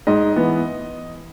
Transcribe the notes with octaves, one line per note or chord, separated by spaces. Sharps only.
G#2 D#5
E3 B3